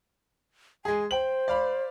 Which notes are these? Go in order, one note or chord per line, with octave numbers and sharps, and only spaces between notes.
G#3 G#4 G#5
C5 G5 F#7
D5 F5 B5